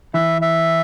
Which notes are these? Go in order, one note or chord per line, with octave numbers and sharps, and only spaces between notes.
E3 E5
E5